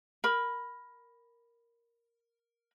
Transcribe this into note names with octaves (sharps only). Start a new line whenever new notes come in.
A#4 B5